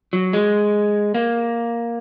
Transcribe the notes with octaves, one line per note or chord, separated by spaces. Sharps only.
F#3
G#3
A#3